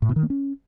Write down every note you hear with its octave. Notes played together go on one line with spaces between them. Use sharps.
A2
B2
D#3
A#3
C#4